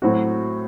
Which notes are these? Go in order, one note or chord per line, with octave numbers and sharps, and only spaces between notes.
A2 F#3 C4 F#4